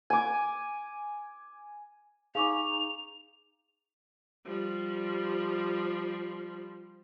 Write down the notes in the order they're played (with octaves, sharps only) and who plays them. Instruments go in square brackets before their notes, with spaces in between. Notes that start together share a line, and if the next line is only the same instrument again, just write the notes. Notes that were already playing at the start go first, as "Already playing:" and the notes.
[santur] G#5 D6
[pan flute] D#4 [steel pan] G#4 [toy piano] F5 C#6 D6 [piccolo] F7
[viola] F3 G3